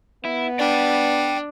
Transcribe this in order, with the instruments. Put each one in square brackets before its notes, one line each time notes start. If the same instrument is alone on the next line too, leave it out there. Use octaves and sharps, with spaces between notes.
[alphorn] B3 [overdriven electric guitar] E4
[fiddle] D4 [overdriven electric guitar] D5 G5